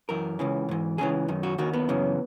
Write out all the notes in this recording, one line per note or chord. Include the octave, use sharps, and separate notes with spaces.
F#2 E3 A#4
C#2 C#3 E3
G#2 E3
C#2 C#3 E3 G#4
F#2 D#3
F#4
D#2 D#3 F#4
B3
F#2 C#3 E3